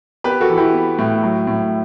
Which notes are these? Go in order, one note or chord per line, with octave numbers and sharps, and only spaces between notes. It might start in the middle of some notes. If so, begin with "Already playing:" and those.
B3 G4 B4
F#4 A4
E3
E4 G4
B3
A2
F#3
A2